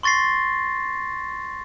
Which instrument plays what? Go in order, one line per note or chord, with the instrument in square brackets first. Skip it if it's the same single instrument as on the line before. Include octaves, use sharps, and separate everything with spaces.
[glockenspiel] C6 C#6 A6 A#6 C7